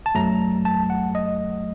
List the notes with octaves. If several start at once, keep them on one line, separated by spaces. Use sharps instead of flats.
A5
F#2 F#3 A3 A#5
A5
F#5
D#5